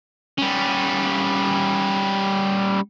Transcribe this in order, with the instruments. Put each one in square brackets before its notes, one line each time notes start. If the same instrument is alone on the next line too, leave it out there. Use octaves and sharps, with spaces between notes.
[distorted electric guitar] G3 C#4